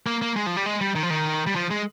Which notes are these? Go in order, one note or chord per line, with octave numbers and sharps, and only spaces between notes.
A#3
A#3
G#3
F3
G3
G#3
G3
D#3
F3
D#3
G3
F3
G#3